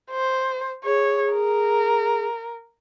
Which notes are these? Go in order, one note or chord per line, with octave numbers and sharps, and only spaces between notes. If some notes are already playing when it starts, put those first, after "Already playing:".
C5
G#4 C#5
A#4